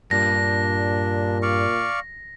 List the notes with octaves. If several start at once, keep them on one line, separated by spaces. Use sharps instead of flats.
G2 A#2 D4 A#6
D5 F5 C#6